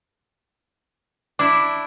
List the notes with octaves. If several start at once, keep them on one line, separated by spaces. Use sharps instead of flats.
D4 E4 D6